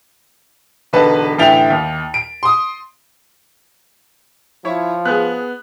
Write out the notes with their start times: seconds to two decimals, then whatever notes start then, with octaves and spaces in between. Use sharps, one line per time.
0.93 E1 D3 D#4 B4 A5
1.38 A1 D3 E4 G5 A6 F7
1.70 D#2
2.14 D7
2.43 C6 D#6
4.65 F3 E4 C#5 C#6
5.05 B3 G#4 F#6